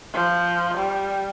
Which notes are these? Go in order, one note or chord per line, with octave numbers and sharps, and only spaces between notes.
F3
G3